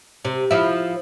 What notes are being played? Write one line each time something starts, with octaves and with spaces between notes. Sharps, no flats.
C3
F3 E4